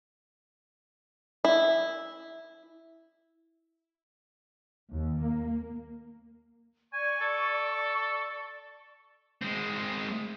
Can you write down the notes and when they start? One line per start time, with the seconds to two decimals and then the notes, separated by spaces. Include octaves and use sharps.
1.45 E4
4.91 D#2
5.21 A#3
6.93 D5 G#5 C#6
7.21 A4
9.42 G#3 C4